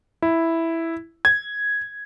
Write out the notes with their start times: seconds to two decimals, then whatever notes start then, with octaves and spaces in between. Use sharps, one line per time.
0.22 E4
1.25 G#6